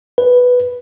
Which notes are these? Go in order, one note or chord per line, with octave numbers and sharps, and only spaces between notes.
B4